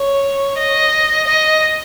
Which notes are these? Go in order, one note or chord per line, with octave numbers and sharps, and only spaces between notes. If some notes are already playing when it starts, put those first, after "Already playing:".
Already playing: C#5
D#5
D#5